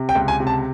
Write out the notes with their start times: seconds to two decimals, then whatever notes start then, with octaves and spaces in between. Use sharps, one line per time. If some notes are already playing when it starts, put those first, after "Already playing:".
Already playing: C3
0.09 G5
0.15 C#2
0.28 G#5
0.40 C3
0.47 A5